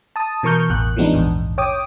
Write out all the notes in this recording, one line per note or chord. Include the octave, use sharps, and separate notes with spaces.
A5 D#6
B2 E3 A#4 C#6 F6 G6
A1 E2 F#6
E3 F3 G#3 B3 D4 D#4
A#1 E2 G#2
C#5 G5 D6 D#6